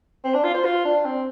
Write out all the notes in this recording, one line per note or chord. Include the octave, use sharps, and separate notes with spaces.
C4
D4
F4
C5
F4
D4
C4